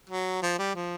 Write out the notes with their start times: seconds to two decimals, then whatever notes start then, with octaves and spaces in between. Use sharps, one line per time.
0.09 F#3
0.42 F3
0.59 G3
0.75 F3